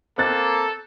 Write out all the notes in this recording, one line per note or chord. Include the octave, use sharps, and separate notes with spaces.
A#3 C4 A4 F#6 A6